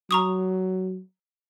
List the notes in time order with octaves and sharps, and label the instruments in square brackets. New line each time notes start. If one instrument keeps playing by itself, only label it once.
[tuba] F#3 [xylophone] A#5 C#6 D#6